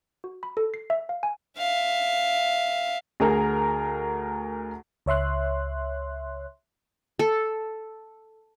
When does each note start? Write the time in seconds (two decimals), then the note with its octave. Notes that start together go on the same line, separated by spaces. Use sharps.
0.24 F#4
0.43 B5
0.57 A4
0.74 C7
0.90 E5
1.09 F5
1.23 G#5
1.58 E5 F5
3.20 D2 G#4 A#4
5.06 C#2 C#5 E5 C6 F#6
7.19 A4